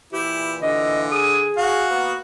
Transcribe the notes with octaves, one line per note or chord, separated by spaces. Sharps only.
A#2 E3 E4 G4
D3 D#5
G#4 D#6
F#4 F5
A#3 B3